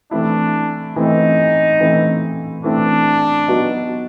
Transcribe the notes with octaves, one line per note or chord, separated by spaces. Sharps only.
E3 A3 C4 D4 E4
E3 A3 C4 D#4 E4
E3 A3 C4 E4
E3 A3 C4 D4 E4
F#3 B3 D#4 F#4